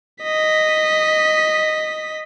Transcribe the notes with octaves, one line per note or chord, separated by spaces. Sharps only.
D#5 B6